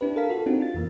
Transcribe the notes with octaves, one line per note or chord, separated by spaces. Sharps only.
D4 E4 G4 B4
A4 A#4 F5 B6
F4 F#4 A4
C4 D4 D#4 F#4 G4
F4 A6
F2 E3 A#3